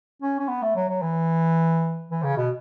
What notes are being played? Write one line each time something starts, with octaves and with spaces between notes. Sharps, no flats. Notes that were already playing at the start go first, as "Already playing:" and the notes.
C#4
C#4
B3
A3
F#3
F#3
E3
E3
C#3
B2